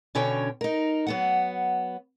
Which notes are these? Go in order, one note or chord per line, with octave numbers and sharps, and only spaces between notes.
B2 D3 C#4 C#5 G5
D#4 A#4
F#3 B3 F#5